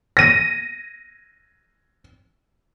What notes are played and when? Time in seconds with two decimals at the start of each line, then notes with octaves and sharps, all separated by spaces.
0.17 A#6 D#7